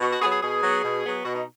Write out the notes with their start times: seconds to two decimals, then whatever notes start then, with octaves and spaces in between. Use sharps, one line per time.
0.01 B2 F#4
0.11 F#4
0.21 F#3 B3 G#4
0.32 G#4
0.42 B2 G#4
0.63 F#3 B3
0.84 B2
1.05 F#3 B3
1.25 B2 F#4
1.35 D#4